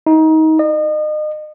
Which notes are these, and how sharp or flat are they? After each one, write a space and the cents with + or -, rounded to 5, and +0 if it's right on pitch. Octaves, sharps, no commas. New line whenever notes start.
D#4 +25
D#5 -35